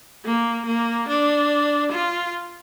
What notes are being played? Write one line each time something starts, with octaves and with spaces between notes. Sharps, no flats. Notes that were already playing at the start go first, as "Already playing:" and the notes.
A#3
A#3
D4
F4